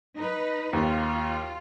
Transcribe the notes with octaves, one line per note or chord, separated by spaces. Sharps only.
D#4 B4
D#2 F4